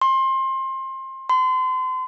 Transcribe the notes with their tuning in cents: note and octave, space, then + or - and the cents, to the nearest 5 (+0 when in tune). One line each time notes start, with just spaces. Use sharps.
C6 +25
C6 -35